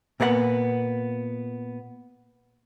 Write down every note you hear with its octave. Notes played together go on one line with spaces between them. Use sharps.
A#2 A#3 B3 D5 F#5